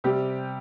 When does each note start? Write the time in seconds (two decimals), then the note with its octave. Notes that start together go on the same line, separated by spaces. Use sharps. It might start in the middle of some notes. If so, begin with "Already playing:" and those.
0.04 C3 G3 C4 G4